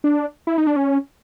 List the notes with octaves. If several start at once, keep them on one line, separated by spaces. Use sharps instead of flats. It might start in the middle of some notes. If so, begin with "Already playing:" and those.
D4
E4
D#4
D4
C#4